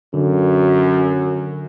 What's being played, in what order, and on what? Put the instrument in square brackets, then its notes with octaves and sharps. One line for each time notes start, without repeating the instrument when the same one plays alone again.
[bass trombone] F#2 [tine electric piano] D3